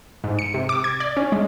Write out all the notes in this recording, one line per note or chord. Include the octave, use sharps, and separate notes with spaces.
G#2
C#7
C3
D6
G#6
D5
C#4
G#3